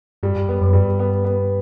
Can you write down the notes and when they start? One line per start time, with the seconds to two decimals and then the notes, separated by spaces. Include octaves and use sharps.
0.23 G2 G3
0.36 G2
0.48 F#2 B3
0.61 F#2
0.73 G2 G3
0.99 B3
1.25 B3